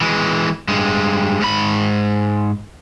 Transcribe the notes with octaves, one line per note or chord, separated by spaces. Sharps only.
E3 G#3
G2 G#3
G#2 B5